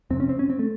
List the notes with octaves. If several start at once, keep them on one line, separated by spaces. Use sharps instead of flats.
F2 C3 C4
C#4
C4
C#4
C4
A3